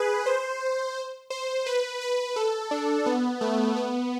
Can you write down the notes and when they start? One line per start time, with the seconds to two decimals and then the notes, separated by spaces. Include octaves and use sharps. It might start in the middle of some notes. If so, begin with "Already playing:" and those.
Already playing: G#4 B4
0.26 C5
1.30 C5
1.66 B4
2.01 B4
2.36 A4
2.71 D4
3.06 B3
3.41 A3
3.76 B3